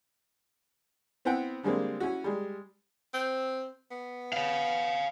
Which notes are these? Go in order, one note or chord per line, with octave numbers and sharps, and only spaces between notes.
B3 C4 E4 F#5 G5
D3 G3 G#3 A#3 C4
C#4 E4 F#4
G3 G#3
C4
B3
C#5 F5